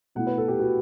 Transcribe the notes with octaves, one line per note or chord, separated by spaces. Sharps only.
B2 A3 E4 F#5
B4
A4
G4
F#4